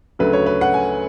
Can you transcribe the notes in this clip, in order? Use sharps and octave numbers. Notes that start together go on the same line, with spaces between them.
D2 C#3 F#3 A3 B4
C#5
B4
F#5
G#5